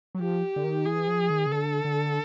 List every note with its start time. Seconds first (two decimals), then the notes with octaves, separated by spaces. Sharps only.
0.15 F#3
0.20 F3 G4
0.56 D3
0.64 D#3
0.86 E3 G#4
1.07 F3
1.30 D#3
1.46 C#3
1.52 D3 A4
1.85 D3